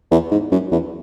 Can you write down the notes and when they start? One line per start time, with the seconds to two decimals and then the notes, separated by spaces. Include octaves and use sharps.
0.11 E2
0.31 G#2
0.52 F#2
0.72 E2